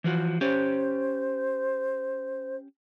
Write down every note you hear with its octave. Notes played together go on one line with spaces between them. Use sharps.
E3 F3 F#4
C#4 G4 C5